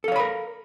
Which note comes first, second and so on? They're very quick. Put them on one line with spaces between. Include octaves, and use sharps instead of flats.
A4 F5 C#5 B5 A#4